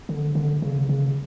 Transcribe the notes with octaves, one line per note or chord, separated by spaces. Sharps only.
D3
D3
C#3
C#3